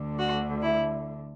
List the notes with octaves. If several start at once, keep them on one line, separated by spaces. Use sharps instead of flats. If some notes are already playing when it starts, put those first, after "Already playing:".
Already playing: D2 D3
F#4
E4